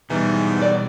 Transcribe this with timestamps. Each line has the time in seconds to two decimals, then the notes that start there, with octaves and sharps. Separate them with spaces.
0.10 E2 G#2 B2 E3 G3
0.62 D#3 D5